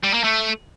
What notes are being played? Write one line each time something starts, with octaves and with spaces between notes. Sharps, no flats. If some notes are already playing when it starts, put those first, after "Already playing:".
G3
A#3
A3